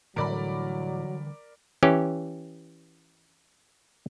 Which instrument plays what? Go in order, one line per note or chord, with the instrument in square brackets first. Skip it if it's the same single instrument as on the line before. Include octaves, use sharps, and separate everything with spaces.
[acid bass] A2 [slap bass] D3 E3 G3 [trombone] F#3 [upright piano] A#4 D5 B5
[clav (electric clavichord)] E3 C#4 G4